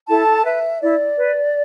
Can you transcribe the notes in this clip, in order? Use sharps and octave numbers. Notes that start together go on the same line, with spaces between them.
E4 A4 A5
B4 E5
E4 D5
B4